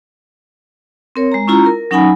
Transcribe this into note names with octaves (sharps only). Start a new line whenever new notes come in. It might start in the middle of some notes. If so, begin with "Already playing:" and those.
C4 A#4 C#5
G#3 A#5
C#4 E4 F4 A#5
A#4
F#3 C#4 D#4 F#5 G#5 B5